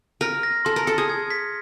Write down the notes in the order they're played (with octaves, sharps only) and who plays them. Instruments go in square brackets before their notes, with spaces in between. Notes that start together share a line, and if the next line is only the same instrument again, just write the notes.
[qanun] A#4 [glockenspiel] F6
[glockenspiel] A#6
[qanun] A4 [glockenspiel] C6
[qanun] A#4
[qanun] A4 [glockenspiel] C#7
[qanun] G#4
[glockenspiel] G#6
B6